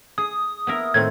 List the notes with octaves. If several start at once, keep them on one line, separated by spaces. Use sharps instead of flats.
G#4 D#6
B3 E4 A#4
A2 D#3 C4 G#6